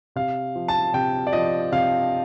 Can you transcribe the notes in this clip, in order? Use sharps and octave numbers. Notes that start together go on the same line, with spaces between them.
C3 F5
F3
A5
C3 G5
D5
F3 D#5
C3 F5